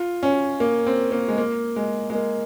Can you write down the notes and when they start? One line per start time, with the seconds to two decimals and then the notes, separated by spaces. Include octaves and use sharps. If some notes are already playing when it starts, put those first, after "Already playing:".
Already playing: F4
0.23 C#4
0.60 A#3
0.87 C4
1.12 A#3
1.28 G#3
1.38 A#3
1.76 G#3
2.10 G#3
2.15 A#3